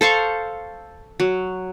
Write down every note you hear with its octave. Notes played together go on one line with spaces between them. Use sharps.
A4 C5 F5 C#6
F#3